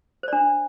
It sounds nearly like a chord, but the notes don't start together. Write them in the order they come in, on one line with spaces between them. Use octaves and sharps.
C5 D5 D4